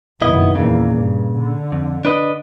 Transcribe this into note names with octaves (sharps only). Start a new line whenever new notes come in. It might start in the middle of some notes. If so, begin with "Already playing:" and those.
F#1 B1 D#3 B3 E4 D#5
E2 A#2 C#3 A#3
G2
D3
F2
D4 B4 D#5